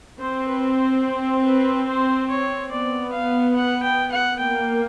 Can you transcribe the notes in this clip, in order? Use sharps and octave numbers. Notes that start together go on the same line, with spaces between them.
C4 C5
B4
C5
C5
B4
C5
C#5
B3 D5
F5
F#5
G5
F#5
A#3 G5